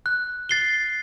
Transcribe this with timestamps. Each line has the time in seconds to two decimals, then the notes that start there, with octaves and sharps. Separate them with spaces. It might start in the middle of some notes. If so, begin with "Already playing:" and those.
0.06 F#6
0.49 A6 C7 G7